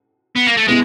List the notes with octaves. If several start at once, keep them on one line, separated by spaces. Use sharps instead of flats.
B3
A#3
A3
G#3 B3 E4